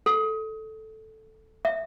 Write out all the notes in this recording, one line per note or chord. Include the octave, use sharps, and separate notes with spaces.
A4
E5